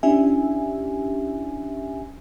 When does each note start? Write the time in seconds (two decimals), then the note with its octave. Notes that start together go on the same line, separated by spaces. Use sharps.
0.03 C#4 D4 E4 G4 E5 G#5